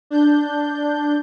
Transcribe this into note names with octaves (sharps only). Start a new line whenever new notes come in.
D4 G6